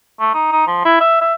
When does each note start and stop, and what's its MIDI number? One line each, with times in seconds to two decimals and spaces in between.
0.20 0.30 57
0.34 0.52 63
0.52 0.63 63
0.68 0.83 53
0.85 0.99 64
1.01 1.20 76
1.21 1.34 76